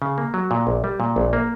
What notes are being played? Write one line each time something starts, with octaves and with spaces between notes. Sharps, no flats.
C#3
A#3
F#3
A#2
A#1
G3
A#2
A#1
A#3